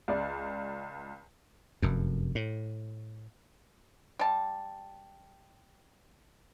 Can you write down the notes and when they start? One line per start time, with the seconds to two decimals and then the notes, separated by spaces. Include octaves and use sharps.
0.08 C#2 D5
1.82 F1 F#2
2.35 A2
4.19 G3 A5